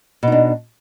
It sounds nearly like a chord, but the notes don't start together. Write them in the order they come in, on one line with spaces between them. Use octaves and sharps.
B2 D#4 D4